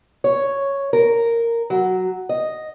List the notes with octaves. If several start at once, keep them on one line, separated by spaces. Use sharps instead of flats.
C#5
A#4
F#3
D#5